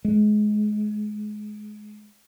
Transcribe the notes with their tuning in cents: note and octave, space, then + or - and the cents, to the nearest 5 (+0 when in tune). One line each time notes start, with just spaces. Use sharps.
G#3 +25